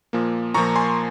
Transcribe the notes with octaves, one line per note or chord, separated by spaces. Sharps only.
A#2 F3 A#3
A#2 F3 A#3 A#5 C#6
G#5 C6